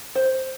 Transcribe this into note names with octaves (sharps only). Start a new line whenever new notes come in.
C5